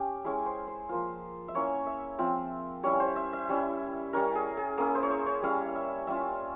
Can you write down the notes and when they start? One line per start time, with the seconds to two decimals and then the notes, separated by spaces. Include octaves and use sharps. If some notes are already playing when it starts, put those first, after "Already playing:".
Already playing: C#4 G4
0.24 G#3 C#4 E4 G#4
0.46 C5
0.67 C5
0.89 F3 A#3 F4 C5
1.48 E5
1.54 A#3 C#4 E4 C#5
1.86 E5
2.19 F3 C4 F4 E5
2.83 G3 C#4 E4 C#5
3.00 C5
3.16 E5
3.33 E5
3.49 G3 C#4 E4
4.13 G3 C#4 E4 A#4
4.35 G#4
4.57 G#4
4.78 A#3 C#4 E4 G#4
4.95 C5
5.03 C#5
5.10 C5
5.26 C#5
5.42 G3 C#4 E4 F5
5.75 E5
6.07 G3 C#4 F4 E5